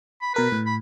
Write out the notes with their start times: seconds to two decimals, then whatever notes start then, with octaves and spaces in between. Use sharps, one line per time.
0.21 B5
0.34 B2 A#4 B4 B6
0.52 A2
0.66 B5